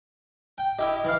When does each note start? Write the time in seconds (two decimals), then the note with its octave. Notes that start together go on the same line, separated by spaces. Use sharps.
0.58 G5
0.79 E4 G4 D#5
1.04 E3 F5